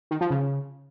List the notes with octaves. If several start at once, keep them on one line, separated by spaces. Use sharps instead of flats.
D#3
F3
C#3